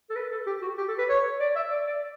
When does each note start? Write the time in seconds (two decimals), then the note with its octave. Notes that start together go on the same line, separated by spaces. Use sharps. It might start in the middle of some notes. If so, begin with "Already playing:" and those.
0.10 A4
0.15 B4
0.31 A4
0.47 G4
0.62 F#4
0.78 G4
0.88 A4
0.98 B4
1.09 C#5
1.40 D5
1.56 E5
1.71 D5
1.87 D5